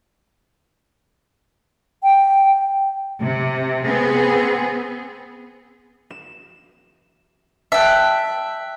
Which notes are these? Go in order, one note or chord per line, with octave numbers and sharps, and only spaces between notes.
G5
C3
B3 C4 G#4
E7
E5 G5 A5 F#6